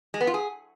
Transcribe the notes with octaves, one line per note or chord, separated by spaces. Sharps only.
G#3
B3
F4
G#4